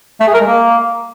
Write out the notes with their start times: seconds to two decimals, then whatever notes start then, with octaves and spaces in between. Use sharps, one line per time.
0.21 A3
0.27 G#4
0.34 A#4
0.41 G#3
0.47 A#3